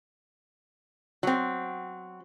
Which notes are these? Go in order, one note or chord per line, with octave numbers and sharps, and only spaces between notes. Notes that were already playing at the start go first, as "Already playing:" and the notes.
F#3 C4